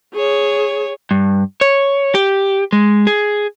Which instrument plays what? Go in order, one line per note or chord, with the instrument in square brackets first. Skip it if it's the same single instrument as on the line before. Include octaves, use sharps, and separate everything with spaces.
[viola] G#4 C#5
[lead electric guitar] G2
C#5
G4
G#3
G#4